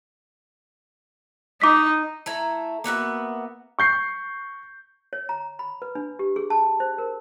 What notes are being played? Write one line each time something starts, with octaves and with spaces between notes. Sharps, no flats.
D#4 D6 B6
A3 E4 A#5
A#3 B3 F#4 E5
C#6 G6 C7
C#5
A#5
B5
B4
D4
G4
G#4
A5
C5
A#4